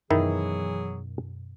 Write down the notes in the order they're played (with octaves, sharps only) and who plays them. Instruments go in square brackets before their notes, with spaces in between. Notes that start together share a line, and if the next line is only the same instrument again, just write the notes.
[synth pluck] F#2 B2 [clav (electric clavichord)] D#3 D#4 E4 [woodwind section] E3 F#3 G#4